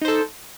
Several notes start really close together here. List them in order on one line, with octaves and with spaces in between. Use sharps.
D#4 C5 A4